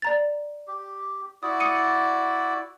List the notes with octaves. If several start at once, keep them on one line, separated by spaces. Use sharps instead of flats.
D5 A#5 A6
G4
E4 F#4 D5 D#6
D#6 C#7 D#7